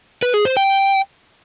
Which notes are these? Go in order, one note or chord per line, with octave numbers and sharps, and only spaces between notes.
B4
G#4
C5
G5